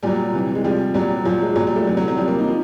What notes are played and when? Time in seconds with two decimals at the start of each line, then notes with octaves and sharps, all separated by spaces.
0.03 A#2 F#3 G3
0.33 C3 E3
0.55 G#3
0.64 C3 F3 G3
0.94 A#2 F#3 G3
1.25 A#2 F3 F#3
1.41 G#3
1.56 A#2 F3 F#3
1.67 G3
1.76 A3
1.86 E3 F#3
1.90 C3
1.97 F#3
2.08 F#3
2.17 F3 G3
2.21 C3
2.28 A#3
2.39 D#4
2.48 F3